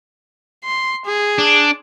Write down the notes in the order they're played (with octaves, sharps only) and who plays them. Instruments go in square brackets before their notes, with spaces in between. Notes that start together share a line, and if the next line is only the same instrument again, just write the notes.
[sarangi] C6
G#4
[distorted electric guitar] D4